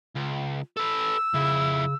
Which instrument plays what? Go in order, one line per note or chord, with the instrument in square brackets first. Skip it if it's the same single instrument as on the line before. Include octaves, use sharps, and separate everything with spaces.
[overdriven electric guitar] C#2
[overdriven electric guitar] A4 B4 [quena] E6
[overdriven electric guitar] F2 E4 [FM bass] C#3